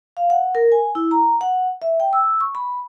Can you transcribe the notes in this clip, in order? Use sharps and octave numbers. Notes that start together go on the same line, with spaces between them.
F5
F#5
A#4
G#5
E4
A#5
F#5
E5
G5
E6
C#6
B5